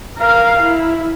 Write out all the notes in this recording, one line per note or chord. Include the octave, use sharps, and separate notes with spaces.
A#4 F5
E4